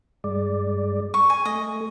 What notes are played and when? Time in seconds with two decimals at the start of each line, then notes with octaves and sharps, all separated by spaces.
0.24 G2 G#3 D5
1.14 C#6
1.30 G#5
1.45 A3 D#5